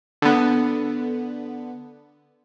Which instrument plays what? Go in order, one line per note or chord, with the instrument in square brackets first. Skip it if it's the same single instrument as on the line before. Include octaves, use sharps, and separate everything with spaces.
[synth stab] D3 B3